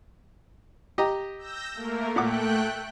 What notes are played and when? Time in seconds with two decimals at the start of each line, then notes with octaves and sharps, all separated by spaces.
0.98 G4 D#5 A#5
1.38 E6 G6 A#6
1.74 A3 A#3 A#4
2.16 A#2 A3 F#5 G5 D6 F#6